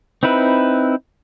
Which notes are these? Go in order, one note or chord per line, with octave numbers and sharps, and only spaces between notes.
C4 D#4 E4 B4